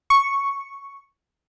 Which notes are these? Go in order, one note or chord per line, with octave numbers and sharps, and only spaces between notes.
C#6